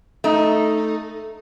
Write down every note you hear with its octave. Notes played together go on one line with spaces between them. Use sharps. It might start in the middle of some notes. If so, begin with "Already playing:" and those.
A3 D#4